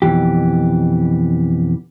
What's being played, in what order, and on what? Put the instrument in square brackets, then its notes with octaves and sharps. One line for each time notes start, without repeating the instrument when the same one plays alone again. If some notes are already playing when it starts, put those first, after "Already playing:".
[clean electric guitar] F2 B2 D#3 E3 G4